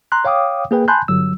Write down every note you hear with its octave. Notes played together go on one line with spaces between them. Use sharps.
A#5 C6 F#6
C#5 F5 G5 D6 D#6
A#3 G#4 B4 G5
G#5 A5 B5 C6 F#6 G6
G1 F#3 E6